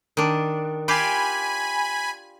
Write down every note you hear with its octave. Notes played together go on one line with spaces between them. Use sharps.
D#3 D4
F4 G4 D5 G#5 B5